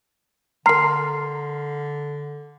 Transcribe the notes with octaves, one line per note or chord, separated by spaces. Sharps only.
D3 A#4 A#5 C6 F6 C7